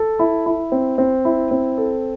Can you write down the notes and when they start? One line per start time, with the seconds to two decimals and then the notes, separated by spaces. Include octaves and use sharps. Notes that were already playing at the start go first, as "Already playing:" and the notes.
Already playing: A4
0.19 E4
0.46 E4
0.72 C4
0.98 C4
1.25 E4
1.51 C4
1.78 A4